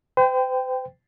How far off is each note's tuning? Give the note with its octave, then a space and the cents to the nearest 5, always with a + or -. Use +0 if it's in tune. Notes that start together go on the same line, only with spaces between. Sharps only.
C5 -45 G5 +0